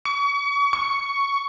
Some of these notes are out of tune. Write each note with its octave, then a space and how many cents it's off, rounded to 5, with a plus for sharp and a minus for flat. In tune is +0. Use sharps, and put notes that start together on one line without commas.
C#6 +35
C#6 +10